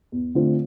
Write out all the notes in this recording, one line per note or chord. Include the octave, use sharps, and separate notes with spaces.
E2
D3 A3 C4 F4